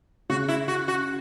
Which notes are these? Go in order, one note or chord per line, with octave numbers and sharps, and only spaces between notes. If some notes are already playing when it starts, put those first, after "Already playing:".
C#3 F#4
E4
F#4
F#4